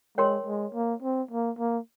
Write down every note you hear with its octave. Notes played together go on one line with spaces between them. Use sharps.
G#3 A#4 C#5 G5 C6
G#3
A#3
C4
A#3
A#3